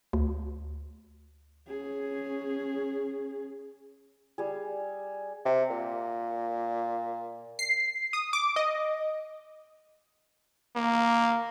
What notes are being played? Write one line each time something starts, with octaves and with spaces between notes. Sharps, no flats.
D2
C#4 G#4
G3 G#4
C3
A#2
C7
D#6
D6
D#5
A#3